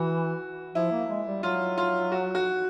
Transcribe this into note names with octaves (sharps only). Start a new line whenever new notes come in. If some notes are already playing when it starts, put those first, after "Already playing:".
Already playing: E3 F#4
F3 E4
A#3
G#3
G3
F#3 F4
F4
F#4
F#4